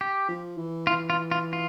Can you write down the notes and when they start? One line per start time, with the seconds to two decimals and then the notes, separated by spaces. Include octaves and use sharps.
0.01 G4
0.29 F3
0.58 E3
0.87 E3 F4
1.10 F4
1.31 F4
1.53 F4